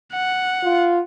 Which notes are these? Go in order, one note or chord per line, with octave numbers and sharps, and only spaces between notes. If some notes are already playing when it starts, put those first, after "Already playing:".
F#5
F4